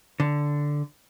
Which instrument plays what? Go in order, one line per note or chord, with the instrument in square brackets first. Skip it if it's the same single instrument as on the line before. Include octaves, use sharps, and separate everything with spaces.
[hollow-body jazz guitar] D3